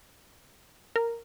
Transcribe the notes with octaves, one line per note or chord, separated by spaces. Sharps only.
A#4